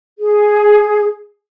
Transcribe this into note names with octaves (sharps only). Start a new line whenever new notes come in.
G#4